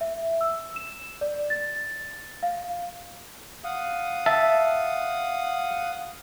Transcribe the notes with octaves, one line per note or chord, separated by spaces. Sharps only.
E5
E6
E7
D5
A6
F5
F5 F#5 D#6
E5 A5